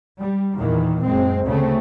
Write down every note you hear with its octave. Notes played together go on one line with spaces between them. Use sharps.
G3
E2 A#2 D#3 E3
F#1 G#3 C4
D2 C#3 A3 C4